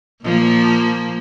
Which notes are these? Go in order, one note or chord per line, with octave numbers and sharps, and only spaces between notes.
A#2 F3 A#3